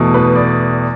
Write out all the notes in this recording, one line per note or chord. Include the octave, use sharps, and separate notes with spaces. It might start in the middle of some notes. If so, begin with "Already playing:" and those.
Already playing: E2 B2 A3
B4
D5